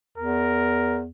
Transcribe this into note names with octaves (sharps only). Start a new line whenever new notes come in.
E2 A#4